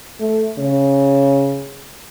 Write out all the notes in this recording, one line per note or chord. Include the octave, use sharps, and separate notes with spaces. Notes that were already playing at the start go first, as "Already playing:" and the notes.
A3
C#3